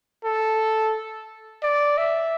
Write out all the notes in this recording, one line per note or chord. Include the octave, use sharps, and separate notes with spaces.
A4
D5
E5